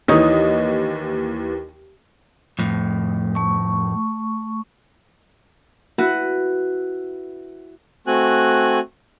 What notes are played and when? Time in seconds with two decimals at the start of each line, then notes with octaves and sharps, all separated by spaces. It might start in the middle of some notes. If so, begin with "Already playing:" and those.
0.08 D#2 E3 D#4 C#5 D#5
2.59 F2 A2
3.35 A3 C#6
5.98 E4 F#4 B4 F#5
8.07 A3 C4 F#4 G#5 F#6